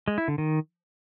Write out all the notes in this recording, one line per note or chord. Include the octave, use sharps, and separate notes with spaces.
G#3
E4
D3
D#3